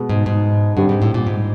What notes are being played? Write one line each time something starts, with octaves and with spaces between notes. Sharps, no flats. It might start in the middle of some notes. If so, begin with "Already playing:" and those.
Already playing: B2 G#3 B3
G#2
G#2
G2 D3 G3 C4
G#2
A2
A#2
G#2